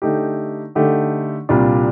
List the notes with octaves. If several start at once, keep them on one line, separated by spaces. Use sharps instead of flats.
D3 A3 D#4 G4
D3 A3 D#4 G4
C2 A#2 G3 D4 F4